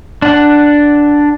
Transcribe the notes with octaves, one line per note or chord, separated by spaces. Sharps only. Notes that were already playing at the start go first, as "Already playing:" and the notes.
D4 F#5